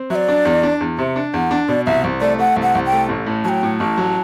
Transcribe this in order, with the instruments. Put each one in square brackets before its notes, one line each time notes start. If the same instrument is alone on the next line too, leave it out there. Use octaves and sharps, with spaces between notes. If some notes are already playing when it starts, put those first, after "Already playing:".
Already playing: [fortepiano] C4
[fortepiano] F#3 [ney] E5
[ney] D5
[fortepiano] D4
E2
D4
E2
[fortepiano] C3 [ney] E5
[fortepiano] D4
[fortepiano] E2 [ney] F#5
[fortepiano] D4
[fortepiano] B2 [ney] D5
[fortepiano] C2 [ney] E5
[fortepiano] C2
[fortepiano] A3 [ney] D5
[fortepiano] A3 [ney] F#5
[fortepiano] C2
[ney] F#5
[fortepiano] C2
[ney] G5
[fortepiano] A3
A1
A2
[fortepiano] F#3 [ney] G5 A5
[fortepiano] A2
[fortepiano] A1 [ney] A5
[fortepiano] F#3